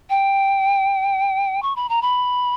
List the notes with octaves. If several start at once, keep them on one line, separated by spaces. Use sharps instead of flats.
G5
C#6
B5
A#5
B5